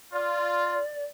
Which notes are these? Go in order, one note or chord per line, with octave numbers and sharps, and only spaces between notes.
F4 D5